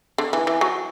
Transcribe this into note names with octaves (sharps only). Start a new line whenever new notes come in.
D3
E3
E3
F#3